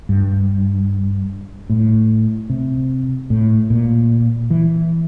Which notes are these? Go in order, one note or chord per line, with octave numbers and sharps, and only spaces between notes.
G2
A2
C3
A2
A#2
E3